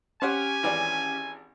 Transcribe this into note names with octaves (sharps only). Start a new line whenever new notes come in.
C#4 G4 C5 C#5 F#5 G#5
G#1 E3 D5